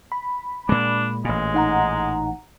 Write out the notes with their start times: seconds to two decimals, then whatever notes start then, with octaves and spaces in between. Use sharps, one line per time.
0.12 B5
0.69 A#2 G#3 D4
1.25 A1 A#2 G#3
1.54 D#4 F#5 A#5